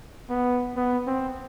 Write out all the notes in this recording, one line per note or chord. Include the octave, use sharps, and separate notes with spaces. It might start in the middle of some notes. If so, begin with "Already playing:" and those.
B3
B3
C4